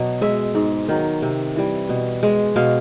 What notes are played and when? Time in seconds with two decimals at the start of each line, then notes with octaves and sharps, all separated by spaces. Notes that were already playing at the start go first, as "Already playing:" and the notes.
Already playing: B2 F#3
0.21 G#3 E5
0.55 G#2
0.89 D#3 F#3
1.22 C3
1.56 E3 G3
1.89 B2
2.23 G#3
2.56 B2 F5